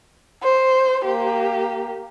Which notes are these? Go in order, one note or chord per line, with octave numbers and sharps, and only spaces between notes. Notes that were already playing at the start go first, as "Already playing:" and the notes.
C5
A#3 G4